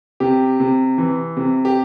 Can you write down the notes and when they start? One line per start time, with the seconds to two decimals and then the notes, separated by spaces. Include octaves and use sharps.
0.20 C3 G4
0.60 C3
0.98 E3
1.37 C3
1.65 G4